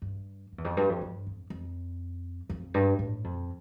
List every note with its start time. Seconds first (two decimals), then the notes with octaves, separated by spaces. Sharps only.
0.02 G2
0.52 F2
0.58 E2
0.65 F2
0.77 G2
0.89 F2
1.01 G2
1.27 F2
1.50 F2
2.50 F2
2.74 G2
2.99 A2
3.24 F2